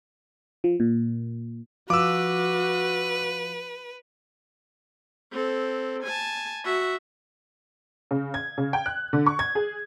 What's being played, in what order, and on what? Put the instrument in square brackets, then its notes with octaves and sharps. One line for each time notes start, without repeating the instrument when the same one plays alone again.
[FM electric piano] F3
A#2
[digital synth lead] F3 [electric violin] F#4 [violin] B4 [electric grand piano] D6 E6
[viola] C4 A4
G#5 A5
F#4 E5
[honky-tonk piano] C#3
G#6
C#3
G5
F#6
D3
C#6
G#6
G#4